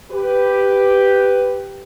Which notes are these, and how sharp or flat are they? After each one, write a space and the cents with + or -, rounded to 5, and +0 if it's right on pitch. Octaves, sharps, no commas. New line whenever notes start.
G4 +0 B4 +10